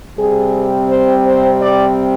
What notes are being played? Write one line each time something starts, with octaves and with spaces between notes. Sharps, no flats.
C3 G3 C4 G#4
C5
C5
D5